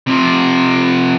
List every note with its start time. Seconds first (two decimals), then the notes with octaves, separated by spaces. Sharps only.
0.07 C3 F3